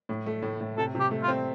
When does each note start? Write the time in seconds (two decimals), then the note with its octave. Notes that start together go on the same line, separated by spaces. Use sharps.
0.09 A2
0.26 A3
0.42 A2
0.61 A2
0.78 C3 A4
0.95 C3
1.00 G4
1.11 A3
1.23 F4
1.28 C4